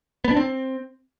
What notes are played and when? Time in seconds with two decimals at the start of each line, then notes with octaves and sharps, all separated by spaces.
0.25 B3
0.31 D4
0.37 C4